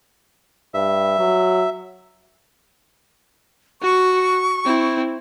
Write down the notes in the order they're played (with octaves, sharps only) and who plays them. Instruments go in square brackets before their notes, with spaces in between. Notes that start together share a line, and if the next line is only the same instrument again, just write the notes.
[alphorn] G2 [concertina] E5
[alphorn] F#3
[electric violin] F#4 [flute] C#6
[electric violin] C4 E4